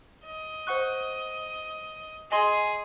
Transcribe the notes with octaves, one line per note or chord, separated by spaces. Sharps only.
D#5
C5 F#5 C#6 F#6
G#4 D#5 G#5 C6